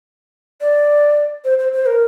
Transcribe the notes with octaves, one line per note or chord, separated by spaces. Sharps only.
D5
C5
C5
C5
A#4